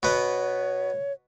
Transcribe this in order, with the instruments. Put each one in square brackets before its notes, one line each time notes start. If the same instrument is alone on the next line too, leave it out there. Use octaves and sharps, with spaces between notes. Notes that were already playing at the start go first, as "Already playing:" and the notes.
[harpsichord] B2 B3 [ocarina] C#5